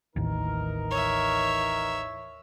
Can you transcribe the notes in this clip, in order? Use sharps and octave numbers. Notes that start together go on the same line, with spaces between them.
A1 D#2 E3 D#4 A#4
C#5 E5